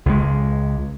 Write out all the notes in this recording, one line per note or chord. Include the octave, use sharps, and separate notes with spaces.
C#2 G#3